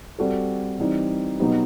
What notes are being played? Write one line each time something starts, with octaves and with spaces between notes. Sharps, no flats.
G3 C4 F#4 A4
E3 G3 C4 D#4
B2 F#3 B3 D#4 G4